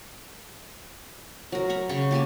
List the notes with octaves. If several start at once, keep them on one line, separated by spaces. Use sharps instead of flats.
F#3 A#4
A#5 B5 C#6
C#3 C#5 G5 C#6
A#3 G4 G#5 A5